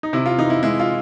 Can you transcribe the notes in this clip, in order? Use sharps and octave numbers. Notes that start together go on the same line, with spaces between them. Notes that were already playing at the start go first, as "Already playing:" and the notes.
D#4
C3 E4
F4
E3 D#4
E4
G#3 E4
F4